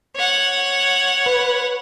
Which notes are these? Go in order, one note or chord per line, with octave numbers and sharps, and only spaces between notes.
C#5 F#5
B4